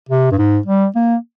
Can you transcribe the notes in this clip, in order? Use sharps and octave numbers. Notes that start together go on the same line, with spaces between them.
C3
G2
G#2
G3
A#3